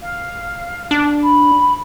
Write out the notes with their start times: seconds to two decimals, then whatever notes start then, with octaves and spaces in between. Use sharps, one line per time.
0.01 F5
0.91 D4
1.22 B5